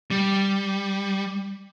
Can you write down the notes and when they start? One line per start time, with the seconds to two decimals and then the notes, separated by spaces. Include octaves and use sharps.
0.11 G3